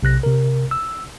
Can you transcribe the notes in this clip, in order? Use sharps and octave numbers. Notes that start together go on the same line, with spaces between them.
B1 C3 F#6 A#6
C3 A#4
E6